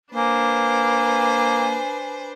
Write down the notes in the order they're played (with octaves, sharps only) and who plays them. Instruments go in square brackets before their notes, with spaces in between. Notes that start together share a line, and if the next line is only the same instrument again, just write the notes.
[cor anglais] A#3 [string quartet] D4 B4 C5 [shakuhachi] G#5